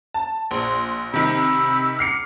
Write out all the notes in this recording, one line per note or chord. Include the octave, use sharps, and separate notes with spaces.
A5
A#1 C6
C3 D#3 B5 E6
D6 F6 C7 C#7